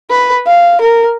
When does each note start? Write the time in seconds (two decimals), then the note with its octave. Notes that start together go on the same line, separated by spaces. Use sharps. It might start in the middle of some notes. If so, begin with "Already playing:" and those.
0.10 B4
0.47 F5
0.81 A#4